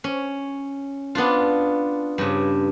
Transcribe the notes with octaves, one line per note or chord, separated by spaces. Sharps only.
C#4
B3 D4 F4
G2 C#3